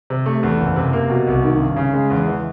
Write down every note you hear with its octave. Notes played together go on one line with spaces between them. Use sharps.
C3
A3
E2
F#1
C3
A#3
B2
C2
D#3
G2
C#3
G#3
E2
E3